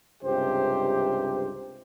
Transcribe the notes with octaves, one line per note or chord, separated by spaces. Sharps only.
C#2 G2 C3 G4 C5